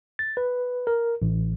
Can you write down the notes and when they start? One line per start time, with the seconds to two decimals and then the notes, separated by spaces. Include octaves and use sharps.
0.19 A6
0.37 B4
0.87 A#4
1.22 A1